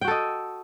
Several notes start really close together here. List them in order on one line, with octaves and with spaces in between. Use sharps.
G5 F#4 A4 D#5